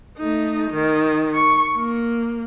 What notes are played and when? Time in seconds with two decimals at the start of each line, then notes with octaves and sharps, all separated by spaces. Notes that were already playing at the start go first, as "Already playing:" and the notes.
0.18 A3 D#4
0.71 D#3
1.35 C#6
1.77 A#3